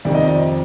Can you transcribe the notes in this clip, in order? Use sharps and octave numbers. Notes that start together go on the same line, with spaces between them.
F2 C3 D#3 D5
D#5
D5